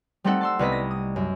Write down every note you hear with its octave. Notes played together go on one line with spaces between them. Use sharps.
G3 A3 C4 D#4 A4 F#5
A5 C6 E6
C2 B3 B4 D#5 B6
A#6
D#6
F#2